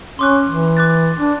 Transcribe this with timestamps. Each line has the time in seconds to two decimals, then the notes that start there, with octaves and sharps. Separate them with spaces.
0.19 C#4 C6 D6 F#6
0.47 E3
0.77 D6 F#6 A6
1.18 D4